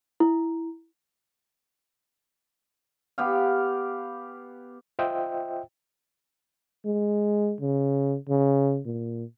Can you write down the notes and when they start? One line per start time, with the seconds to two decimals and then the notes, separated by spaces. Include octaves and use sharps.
0.20 E4
3.18 B3 G4 F5
4.99 F4 C5 D#5 E5 G5
6.86 G#3
7.60 C#3
8.29 C#3
8.86 A#2